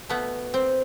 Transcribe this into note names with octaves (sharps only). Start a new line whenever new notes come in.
B2 A3 B3
C4